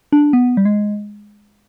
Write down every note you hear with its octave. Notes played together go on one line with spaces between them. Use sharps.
D4
B3
G3
G#3